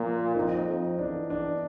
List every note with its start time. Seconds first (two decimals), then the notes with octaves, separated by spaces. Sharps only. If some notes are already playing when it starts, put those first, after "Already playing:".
Already playing: A#2 F3 A#3
0.35 F2 D#4
0.67 F2
0.99 E2 D4
1.30 D4